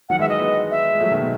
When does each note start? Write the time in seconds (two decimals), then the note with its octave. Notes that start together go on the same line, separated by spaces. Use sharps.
0.09 D#3 F#3 F#5
0.19 E3 G#3 E5
0.29 D#5
0.40 G#3 B3
0.71 E5
0.93 G#3
1.00 F#3 A3
1.11 B2 D#3
1.22 B2